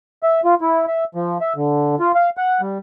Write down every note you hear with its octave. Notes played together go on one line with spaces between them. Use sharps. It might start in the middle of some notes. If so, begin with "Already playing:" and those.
E5
F4
E4
E5
F3
E5
D3
F4
F5
F#5
G3